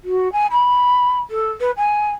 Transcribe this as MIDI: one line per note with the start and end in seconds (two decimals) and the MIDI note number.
0.04 0.31 66
0.32 0.46 80
0.51 1.18 83
1.30 1.50 69
1.60 1.71 71
1.77 2.11 80